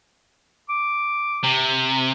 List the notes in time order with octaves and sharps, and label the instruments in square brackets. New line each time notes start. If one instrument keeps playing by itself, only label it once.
[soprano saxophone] D6
[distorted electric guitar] C3